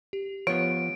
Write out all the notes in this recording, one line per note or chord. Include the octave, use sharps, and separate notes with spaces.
G4
F3 B3 C#5 D7